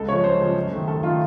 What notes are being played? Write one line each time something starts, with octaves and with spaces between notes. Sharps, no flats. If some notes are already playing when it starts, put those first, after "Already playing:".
Already playing: C#2 A4
C#3 F3 C#5
C#2 C5
C#3 F3
F#2
D#3 A3
F#2 A4
D#3 A3 F4